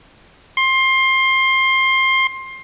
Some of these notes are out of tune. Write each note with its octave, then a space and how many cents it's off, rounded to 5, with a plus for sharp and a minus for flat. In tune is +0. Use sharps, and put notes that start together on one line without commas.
C6 +20